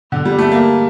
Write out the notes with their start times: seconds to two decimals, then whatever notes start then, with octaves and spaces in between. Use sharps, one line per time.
0.12 D3
0.25 G3
0.38 A3
0.52 A#3